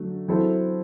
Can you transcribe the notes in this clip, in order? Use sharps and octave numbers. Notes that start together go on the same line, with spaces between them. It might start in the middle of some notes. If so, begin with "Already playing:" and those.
Already playing: D3 F#3 A3 D4 F#4
F#3 C4 E4 A4 C5